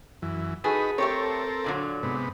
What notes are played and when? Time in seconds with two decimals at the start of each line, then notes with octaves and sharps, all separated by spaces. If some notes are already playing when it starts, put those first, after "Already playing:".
0.22 F#2 E3
0.64 D#4 F#4 G#4 A4 B4
0.98 A3 C4 G4 A4 A#4 C#5
1.64 A#2 D3 F#3
2.03 G#2 C3 B3